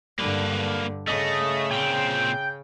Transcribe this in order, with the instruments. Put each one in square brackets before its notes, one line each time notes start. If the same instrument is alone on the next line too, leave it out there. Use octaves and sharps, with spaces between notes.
[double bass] G2 D3 [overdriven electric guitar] A#3 B4
[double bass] C#3 [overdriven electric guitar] A3 [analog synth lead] D#5
[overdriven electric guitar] A#2 C4 [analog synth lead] G5